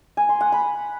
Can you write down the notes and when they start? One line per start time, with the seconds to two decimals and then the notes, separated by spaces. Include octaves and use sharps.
0.17 G#5
0.29 C6
0.41 F#5
0.52 B5